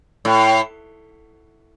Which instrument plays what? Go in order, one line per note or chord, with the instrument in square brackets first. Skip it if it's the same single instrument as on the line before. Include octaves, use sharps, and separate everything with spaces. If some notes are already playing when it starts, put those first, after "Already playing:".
[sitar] A2